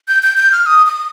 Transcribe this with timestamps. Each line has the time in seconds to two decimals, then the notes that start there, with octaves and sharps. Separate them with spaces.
0.08 G6
0.23 G6
0.37 G6
0.52 F6
0.66 D#6
0.86 D#6